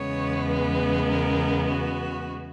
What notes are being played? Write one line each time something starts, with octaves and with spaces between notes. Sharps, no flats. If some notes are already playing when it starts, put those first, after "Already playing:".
Already playing: E2 C#3 G#3 B3 C#5
B4
A#4
F#4